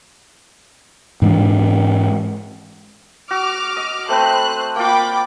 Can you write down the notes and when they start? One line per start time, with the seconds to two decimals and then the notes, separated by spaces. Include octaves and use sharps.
1.22 G#2 E3 G#3 D4
3.31 F#4 D6 F6
3.76 D#5
4.09 A3 C4 B4 C5 F#6
4.76 A#3 F4 G5 B5 D6